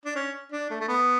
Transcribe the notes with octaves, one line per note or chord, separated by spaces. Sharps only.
D4
C#4
D4
A3
A3
B3